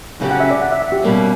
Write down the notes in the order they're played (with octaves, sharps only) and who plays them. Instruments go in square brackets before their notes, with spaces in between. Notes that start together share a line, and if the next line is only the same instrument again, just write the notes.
[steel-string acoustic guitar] F#2 C#3 F#3 C#4 G4
[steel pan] F#5
E5
D5
F#5
E5
E5
G4
[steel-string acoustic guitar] B2 G3 A#3 C#4